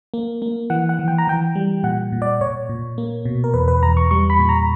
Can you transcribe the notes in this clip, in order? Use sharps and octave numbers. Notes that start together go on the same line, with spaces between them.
A#3
A#3
E3 F#5
F#5
E3
G5
A#5
E3 G5
G3
A#2 F#5
A#2
D5
A#2 C#5
A#2
A#3
B2
A#4
E2 B4
B4
E2 A#5
C#6
G3 C#6
B5
A#2
A#5